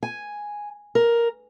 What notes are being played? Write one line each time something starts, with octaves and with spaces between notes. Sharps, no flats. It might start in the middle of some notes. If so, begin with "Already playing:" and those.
G#5
A#4